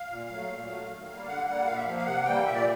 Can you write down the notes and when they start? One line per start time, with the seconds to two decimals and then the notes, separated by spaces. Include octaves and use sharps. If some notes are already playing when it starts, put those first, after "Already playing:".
Already playing: F5
0.10 A#2
0.30 F#3 A3
0.49 A#2
0.68 F#3 A3
0.88 D#3
1.08 G3 A#3
1.27 D3 F#5
1.47 G3 A#3 F#5
1.66 A#2 F5
1.76 E5
1.86 F3 A#3 F5
1.97 F5
2.06 C3 F#5
2.25 E3 G3 A#3 G5
2.45 A#2 E5
2.54 D5